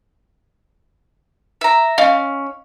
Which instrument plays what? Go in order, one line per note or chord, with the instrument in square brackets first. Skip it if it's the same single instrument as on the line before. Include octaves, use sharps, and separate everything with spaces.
[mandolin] E5 A#5
[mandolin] C#4 [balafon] D#5 F5